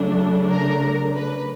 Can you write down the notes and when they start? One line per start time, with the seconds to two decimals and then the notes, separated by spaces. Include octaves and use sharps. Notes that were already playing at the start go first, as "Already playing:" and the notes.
Already playing: C#3 F#3 A3 D4
0.50 A#4
1.15 B4